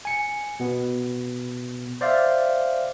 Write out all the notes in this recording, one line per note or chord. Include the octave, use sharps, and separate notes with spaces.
G#5 C#7
B2 B3
C5 D5 E5 F5